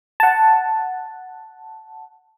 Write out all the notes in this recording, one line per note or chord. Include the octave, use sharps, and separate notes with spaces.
F#5 A5